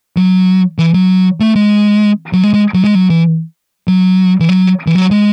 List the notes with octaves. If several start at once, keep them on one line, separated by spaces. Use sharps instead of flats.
F#3
E3
F#3
A3
G#3
F#3
G#3
G#3
F#3
G#3
F#3
E3
F#3
E3
F#3
E3
F#3
G#3